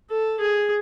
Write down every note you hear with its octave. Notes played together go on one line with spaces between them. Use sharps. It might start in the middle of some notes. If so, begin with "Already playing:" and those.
A4
G#4